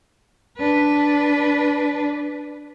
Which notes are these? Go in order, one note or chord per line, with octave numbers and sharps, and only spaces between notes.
D4 B4